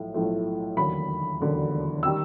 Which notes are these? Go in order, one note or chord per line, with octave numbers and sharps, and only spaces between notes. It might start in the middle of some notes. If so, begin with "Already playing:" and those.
Already playing: B1 A2 F3 A3
B1 A2 F3 A3
E1 D#2 D3 F#3 B5
E1 D#2 D3 F#3
D#3 G3 E6